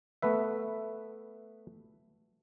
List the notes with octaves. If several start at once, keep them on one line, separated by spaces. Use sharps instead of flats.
A3 B3 B4 E5